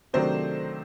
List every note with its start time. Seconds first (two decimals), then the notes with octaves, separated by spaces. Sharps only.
0.13 C3 D#3 F#3 A3 D4 C5